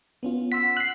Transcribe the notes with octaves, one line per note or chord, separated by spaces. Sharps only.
B3 C#4 F4
F#5 C6 E6 B6
F#5 F#6 C7